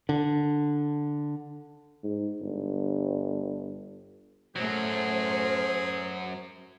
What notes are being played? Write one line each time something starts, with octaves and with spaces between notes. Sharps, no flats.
D3
G#2
G1
F#2 A2 F#3 A3 G#4 C5